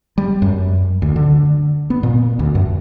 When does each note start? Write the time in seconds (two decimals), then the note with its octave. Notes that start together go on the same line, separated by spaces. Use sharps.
0.18 G3
0.42 F#2
1.02 D2
1.16 D3
1.90 B3
2.03 A#2
2.39 D2
2.55 F#2